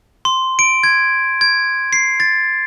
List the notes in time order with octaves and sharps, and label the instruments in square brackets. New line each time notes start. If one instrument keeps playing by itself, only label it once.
[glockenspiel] C6
D7
G#6
G#6
C7
A6